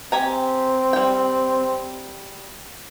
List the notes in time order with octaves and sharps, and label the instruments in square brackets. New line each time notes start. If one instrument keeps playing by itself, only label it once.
[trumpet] C4 [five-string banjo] G4 G#5 A#5
[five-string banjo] G3 G5